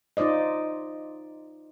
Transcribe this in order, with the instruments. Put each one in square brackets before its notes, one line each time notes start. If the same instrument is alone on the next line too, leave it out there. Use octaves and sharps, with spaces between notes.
[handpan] D#4 F4 C5 D5 D#5